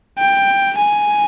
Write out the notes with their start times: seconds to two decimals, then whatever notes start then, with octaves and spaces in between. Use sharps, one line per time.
0.19 G5
0.78 G#5